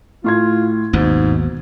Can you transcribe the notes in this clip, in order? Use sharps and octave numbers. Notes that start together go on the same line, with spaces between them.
A2 F4 C6 G#6
G#1 D#2 G#2 B2